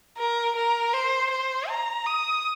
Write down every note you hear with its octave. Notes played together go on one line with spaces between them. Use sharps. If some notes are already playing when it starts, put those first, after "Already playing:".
A#4
A#4
C5
C5
A#5
D#6